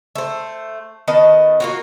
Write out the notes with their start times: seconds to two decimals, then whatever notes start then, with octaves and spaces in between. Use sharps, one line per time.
0.15 A3 C5
1.08 D#3 B3 D#5 A5
1.60 A#3 F4 F#4